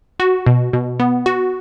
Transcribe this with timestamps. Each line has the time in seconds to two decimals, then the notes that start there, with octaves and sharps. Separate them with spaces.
0.20 F#4
0.46 B2
0.73 B2
1.00 B3
1.26 F#4